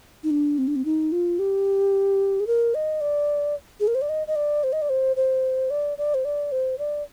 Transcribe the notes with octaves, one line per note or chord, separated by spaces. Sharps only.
D#4
D4
C4
D4
C4
D#4
F4
G4
G#4
A#4
D#5
D5
G#4
A#4
C5
D5
D#5
D#5
D5
C5
D#5
D5
C5
C5
D5
D5
C5
D5
C5
D5